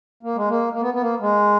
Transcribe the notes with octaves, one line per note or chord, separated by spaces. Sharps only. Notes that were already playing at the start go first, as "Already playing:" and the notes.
A#3
G#3
A#3
A#3
B3
B3
A#3
G#3